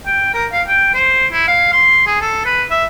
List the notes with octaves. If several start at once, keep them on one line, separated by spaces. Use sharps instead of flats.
G5
A#4
F5
G5
C5
E4
F5
C6
G#4
A4
B4
E5